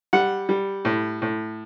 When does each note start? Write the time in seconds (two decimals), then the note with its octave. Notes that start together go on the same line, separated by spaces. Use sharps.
0.13 G3 F#5
0.49 G3
0.85 A2
1.22 A2